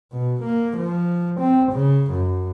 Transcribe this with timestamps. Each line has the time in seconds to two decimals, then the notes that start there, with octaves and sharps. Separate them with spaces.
0.12 B2
0.43 A#3
0.77 F3
1.40 C4
1.72 C#3
2.11 F#2